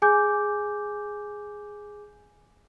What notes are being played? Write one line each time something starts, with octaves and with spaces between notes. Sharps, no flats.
G#4 G#5 D6 G6